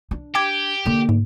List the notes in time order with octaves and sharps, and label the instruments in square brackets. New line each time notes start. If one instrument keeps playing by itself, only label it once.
[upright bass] D4
[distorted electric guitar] G4 [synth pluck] G5 D6 G#6
[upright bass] D3 A#3
[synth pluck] G#2